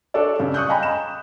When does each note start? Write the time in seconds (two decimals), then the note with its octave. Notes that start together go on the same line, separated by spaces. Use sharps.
0.14 D4 A4 C#5 D5
0.39 G2 C#3
0.54 C#6 D#6 F#6 G6
0.68 D#5 F5 G5 G#5 A#5 B5
0.83 E7